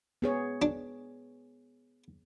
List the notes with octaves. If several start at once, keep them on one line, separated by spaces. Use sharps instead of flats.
B3 G#4 C#5
D4